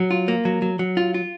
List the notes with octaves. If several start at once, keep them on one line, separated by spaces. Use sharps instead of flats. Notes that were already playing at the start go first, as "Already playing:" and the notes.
Already playing: F#3
F4
A#3
F#3
F#3
F#3
F4
F4